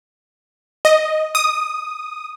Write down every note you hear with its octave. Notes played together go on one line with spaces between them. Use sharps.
D#5
D#6